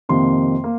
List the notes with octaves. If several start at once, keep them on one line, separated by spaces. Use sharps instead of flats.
F2 C3 D#3 A#3 C6
A#3